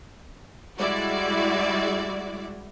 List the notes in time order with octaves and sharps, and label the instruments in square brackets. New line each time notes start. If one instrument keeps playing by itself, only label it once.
[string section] G3 G#3 E4 F#4 D5